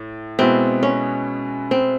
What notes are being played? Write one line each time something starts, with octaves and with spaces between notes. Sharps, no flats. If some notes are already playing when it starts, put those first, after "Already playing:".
Already playing: A2
B2 G#3 B3 C4 E4
C#4
C4